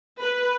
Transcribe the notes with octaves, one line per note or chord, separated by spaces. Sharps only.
B4